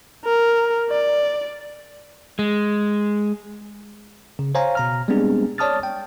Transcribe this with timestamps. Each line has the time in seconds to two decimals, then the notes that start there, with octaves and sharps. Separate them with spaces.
0.25 A#4
0.90 D5
2.39 G#3
4.39 C#3
4.55 C5 C#5 F5 G#5 A#5
4.75 B2 A#5 F6
5.08 G3 G#3 B3 C4 D4 G#4
5.58 C#5 D5 A5 D#6 F6 A6
5.83 G5